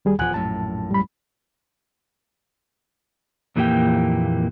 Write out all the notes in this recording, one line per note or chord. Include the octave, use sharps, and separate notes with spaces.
D#2 G3 G#4
D#1 E2 F3 F#5 G#5 F#6
A#1 F#2 A2 A5
G3 B5
F2 A#2 E3 A#3 G4 G5